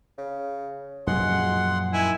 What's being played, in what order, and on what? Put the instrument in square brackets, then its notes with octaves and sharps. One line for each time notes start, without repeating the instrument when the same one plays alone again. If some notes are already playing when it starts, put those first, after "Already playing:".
[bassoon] C#3
[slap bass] F#2 A#2 F3 [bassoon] G#3 [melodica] F#5 C6
[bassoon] D#3 [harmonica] E4 G#5